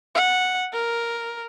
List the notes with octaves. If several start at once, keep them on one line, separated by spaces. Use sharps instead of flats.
F#5
A#4